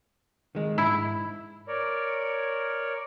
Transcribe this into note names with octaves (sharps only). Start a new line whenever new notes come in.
D#3 G#3
G#2 E4
A#4 C#5 D5